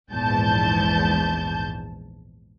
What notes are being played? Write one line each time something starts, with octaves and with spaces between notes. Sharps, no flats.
A#1 E2 G#2 A5 G6